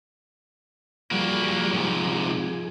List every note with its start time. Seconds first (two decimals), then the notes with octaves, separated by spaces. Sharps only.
1.11 F3 G3 A#3 F#4 G#4
1.73 G#2 C3